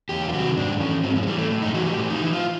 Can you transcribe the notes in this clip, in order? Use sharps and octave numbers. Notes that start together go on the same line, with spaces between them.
E2 G4
F4
C3 D#3 F#4
G#2 D4
E3 C#4
G#2 C4
F#3
G#3
E3 G3
A3
A2
D#4
E3 F#4
G4
A2
D#4
E3 E4
F4